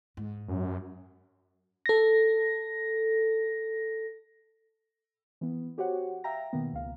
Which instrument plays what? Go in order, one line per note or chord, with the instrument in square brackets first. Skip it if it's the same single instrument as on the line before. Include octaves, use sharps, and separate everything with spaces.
[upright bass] G#2
[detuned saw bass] F#2
[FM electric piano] A4 A#6
[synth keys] E3 B3
F#4 G4 C5 C#5 F#5
E5 F5 G5 A#5 A#6
B2 D#3 A#3 B3
C#2 F5